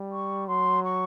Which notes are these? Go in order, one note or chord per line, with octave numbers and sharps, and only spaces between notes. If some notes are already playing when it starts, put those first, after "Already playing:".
Already playing: G3
C#6
F#3 C6
C#6